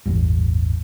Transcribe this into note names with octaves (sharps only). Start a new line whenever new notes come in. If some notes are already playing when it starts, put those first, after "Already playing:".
A1 E2 G2